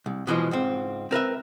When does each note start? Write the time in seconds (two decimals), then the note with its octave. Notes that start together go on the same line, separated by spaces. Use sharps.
0.06 C2
0.27 B2 E3 F3 G#3
0.51 C#2 G#2 C4
1.11 C4 A#4 B4 E5